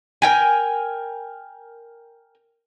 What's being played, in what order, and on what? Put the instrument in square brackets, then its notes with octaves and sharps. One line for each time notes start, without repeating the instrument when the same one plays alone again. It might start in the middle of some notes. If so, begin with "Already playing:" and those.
[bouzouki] A#4 G5 G#5